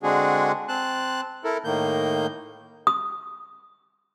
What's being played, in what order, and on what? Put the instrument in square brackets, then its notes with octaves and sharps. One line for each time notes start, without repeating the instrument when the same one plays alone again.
[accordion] D3 G#3 C4 D4 F#4 G#4
C4 A5 F#6
E4 A4 A#4
A2 D#3 A#3 G6
[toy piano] D#6